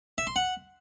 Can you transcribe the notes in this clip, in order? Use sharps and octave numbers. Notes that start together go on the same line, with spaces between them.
E5
C6
F#5